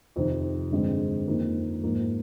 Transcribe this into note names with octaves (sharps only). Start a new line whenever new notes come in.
F2 C3 D#3
G2 D3 G#3 C4
F2 D#3 A#3
G#2 F3 A#3